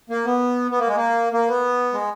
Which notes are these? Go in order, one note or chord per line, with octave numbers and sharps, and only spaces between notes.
A#3
B3
B3
A#3
G#3
A#3
A#3
B3
G#3